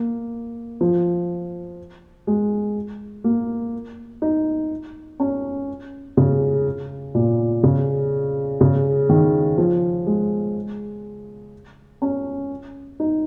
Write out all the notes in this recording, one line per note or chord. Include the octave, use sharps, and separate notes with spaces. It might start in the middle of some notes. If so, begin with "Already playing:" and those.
Already playing: A#3
F3
G#3
A#3
D#4
C#4
C#3
A#2
C#3
C#3
D#3
F3
G#3
C#4
D#4